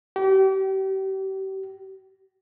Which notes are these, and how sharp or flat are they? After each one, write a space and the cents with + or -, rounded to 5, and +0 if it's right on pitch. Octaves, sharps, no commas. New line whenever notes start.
G4 -35